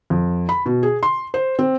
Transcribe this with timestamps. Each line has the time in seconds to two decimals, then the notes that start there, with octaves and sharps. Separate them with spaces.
0.10 F2
0.49 B5
0.66 B2
0.83 G#4
1.03 C6
1.34 C5
1.59 C4